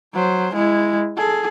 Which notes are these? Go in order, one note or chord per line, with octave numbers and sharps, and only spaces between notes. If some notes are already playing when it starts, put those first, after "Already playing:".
F#3 C5
G#3 E4
G#4 A4